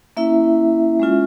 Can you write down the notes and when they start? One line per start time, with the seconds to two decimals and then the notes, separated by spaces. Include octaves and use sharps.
0.17 A#3 C#4 E4 E5
1.00 G#3 C#4 F4